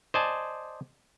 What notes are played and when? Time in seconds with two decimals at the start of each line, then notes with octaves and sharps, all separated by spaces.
0.14 C5 D5 D#5 G#5 A5